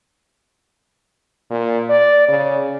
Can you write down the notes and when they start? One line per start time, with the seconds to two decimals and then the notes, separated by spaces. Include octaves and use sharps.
1.50 A#2
1.90 D5
2.29 C#3